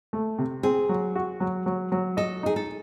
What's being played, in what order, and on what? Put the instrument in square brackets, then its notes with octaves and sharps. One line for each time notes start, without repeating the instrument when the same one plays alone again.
[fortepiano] A3
C3
[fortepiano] C4 [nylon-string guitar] G#4
[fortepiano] F#3
F#4
F#3
F#3
F#3
[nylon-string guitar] A4 [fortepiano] D#5
[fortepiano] D#4 [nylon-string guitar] G#4
[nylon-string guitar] A4